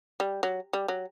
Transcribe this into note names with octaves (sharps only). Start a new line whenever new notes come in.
G3
F#3
G3
F#3